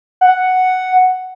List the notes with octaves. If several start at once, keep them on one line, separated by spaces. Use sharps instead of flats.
F#5